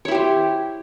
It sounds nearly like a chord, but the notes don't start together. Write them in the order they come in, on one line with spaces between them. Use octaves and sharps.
C#5 E4 G4 C5